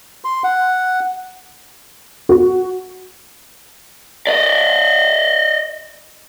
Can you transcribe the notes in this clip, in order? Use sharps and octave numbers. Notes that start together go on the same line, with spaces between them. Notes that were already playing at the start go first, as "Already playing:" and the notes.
C6
F#5
F#4
D5 D#5